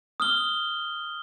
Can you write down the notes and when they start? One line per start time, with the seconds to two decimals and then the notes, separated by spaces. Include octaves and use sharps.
0.20 D#6 F6 G7